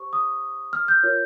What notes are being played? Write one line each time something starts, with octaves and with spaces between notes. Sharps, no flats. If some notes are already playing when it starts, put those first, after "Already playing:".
Already playing: G4 C5 C#6
D#6
F6
G6
F4 A#4 C#5